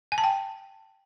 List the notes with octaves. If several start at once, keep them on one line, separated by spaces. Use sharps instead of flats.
G#5
A5
G5